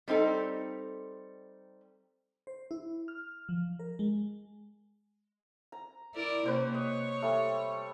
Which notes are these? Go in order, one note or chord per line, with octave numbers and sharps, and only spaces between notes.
G3 C4 D#4 A4
C5
E4
F6
F3
A#4
G#3
A#5
E4 A#4 D5
C3 A#3 C#4 B4 C5
C#5 D#5
G3 A3